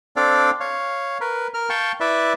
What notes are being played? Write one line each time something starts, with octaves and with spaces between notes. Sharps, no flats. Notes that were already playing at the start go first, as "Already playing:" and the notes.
C4 D4 A4 D5 F5
C#5 F5
A#4 B4
A#4 F6
F5 G5 A5 C#6
E4 B4 D5 E5